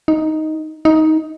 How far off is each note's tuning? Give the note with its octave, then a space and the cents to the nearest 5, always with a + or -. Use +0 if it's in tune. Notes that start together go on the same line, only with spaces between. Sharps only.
D#4 +5
D#4 +15